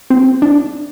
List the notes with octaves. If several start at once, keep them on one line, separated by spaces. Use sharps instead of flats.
C4
D4